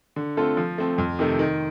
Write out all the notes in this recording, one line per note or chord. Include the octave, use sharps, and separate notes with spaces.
D3
A3 C4 F4 A4
F3
A3 C4
F2
C3 D#3 A3
D#3